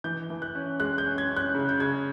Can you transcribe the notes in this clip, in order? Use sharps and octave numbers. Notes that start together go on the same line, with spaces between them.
E3 G6
E3
F#6
C#4
G#3 F#6
G6
C#4
G#6
C#4
F#6
C#3
G6
C#3 G#6